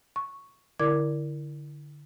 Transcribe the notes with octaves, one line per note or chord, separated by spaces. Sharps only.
C#6
D3 E4 A#4 D5 D6 G#6